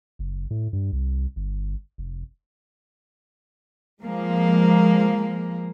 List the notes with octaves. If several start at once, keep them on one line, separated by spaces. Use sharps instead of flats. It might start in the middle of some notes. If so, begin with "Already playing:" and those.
F#1
A2
G2
C2
G1
F1
F3 G#3 A#3